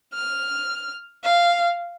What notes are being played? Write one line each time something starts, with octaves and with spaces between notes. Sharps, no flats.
F6
F5